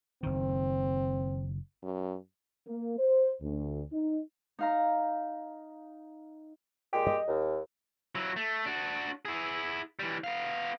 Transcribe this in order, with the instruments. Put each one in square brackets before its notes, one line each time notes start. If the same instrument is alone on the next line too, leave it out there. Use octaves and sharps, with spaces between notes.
[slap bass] F#1 D#3 [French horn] C4
[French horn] F#2
[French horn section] A#3
C5
D2
D#4
[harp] D#4 F5 A#5
[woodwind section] A#2 G#3 G4
[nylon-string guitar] D#5
[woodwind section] D#2
[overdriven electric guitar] F#3 E4
A3
D4 F#4
E4 G#4
E3 G3
B3 F5